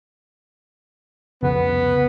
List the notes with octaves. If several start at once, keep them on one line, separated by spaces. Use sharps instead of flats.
C2 F2 C#3 B3